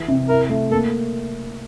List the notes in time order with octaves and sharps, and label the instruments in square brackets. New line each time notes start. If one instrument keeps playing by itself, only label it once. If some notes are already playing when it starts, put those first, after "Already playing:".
Already playing: [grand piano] E3
C3
[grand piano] E4 [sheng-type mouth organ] A#4
[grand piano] A3
[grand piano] A#3 [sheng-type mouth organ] A4